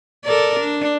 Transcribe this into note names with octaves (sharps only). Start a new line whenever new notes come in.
A4 A#4 D5
D4